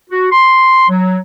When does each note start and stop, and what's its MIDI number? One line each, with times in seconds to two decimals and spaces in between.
0.10 0.27 66
0.32 0.85 84
0.89 1.17 54